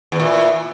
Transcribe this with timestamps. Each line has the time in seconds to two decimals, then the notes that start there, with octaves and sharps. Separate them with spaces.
0.12 E2
0.16 E3
0.20 A#2